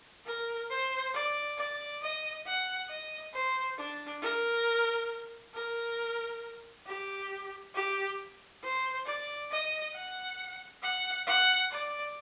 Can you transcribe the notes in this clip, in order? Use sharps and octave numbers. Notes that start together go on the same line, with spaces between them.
A#4
C5
D5
D5
D#5
F#5
D#5
C5
D4
A#4
A#4
G4
G4
C5
D5
D#5
F#5
F#5
F#5
D5